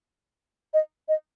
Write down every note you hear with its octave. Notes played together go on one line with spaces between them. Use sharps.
D#5
D#5